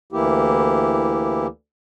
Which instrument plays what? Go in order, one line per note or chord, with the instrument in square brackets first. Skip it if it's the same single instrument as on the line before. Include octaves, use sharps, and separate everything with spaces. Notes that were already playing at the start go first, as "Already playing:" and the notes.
[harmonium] D2 E3 A#3 E4 G4